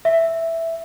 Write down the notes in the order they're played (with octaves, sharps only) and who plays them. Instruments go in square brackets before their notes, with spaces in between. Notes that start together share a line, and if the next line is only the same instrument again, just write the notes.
[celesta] E5